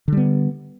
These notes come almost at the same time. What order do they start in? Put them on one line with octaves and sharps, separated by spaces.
D3 G3 B3